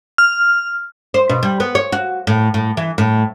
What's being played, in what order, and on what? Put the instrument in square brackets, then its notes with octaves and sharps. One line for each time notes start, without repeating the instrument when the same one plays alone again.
[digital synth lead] F6
[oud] C5
B2
G3
B3
C#5
F#4
A2
A2
E3
A2